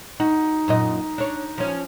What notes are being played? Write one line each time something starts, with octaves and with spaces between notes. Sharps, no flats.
D#4 F#4
F#2 A#2 D#5
D4 C#5
F3 C#4